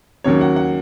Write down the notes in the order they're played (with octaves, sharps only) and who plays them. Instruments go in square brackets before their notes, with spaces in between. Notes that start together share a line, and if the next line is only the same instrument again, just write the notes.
[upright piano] D#2 C#3 F#3 A#3 C#5
F#5
F#5